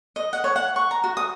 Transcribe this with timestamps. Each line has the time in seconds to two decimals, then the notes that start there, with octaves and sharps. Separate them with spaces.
0.16 D#5
0.33 F#5
0.44 C#5
0.56 F#5
0.76 C#6
0.91 A#5
1.04 F#4
1.17 D#6